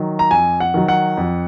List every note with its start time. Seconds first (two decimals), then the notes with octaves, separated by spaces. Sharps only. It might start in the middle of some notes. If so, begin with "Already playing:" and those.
Already playing: D#3 F#3
0.19 A#5
0.31 F2 G#5
0.60 F#5
0.74 D#3 F#3
0.88 F#5
1.17 F2